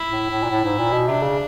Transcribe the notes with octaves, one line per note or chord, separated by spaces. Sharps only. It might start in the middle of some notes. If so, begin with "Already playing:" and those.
Already playing: E4
A2
A2
A#2
A2
G#2
A#2
B2
C3 D4
C#3